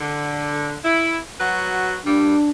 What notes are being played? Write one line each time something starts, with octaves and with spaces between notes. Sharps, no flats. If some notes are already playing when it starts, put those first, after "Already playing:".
D3
E4
F#3 F#4 B4
G2 A#2 G3 D4